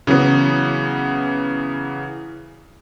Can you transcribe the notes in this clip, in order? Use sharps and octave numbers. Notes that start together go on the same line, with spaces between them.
C#3 E3 F#3 B3